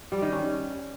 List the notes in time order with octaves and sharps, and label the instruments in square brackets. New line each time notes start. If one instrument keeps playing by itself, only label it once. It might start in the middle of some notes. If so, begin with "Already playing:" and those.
[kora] G3
D#3
C#4